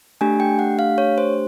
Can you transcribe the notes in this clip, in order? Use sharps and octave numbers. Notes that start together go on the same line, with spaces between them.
A3 D4 G4 G#5
G5
F#5
F5
C#5
C5